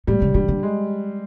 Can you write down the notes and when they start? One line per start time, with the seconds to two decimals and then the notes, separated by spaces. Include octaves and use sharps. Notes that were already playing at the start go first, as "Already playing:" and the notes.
0.07 A2 G3
0.22 C#3
0.34 D3 G3
0.48 D3
0.63 G#3